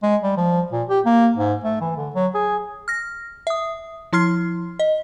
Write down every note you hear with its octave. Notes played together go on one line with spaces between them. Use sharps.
G#3
G3
F3
A#2
G4
A#3
G#2
A3
E3
D3
F#3
G#4
F6 A#6
E5 D#6
F3 E4 C6 F6 C7
D#5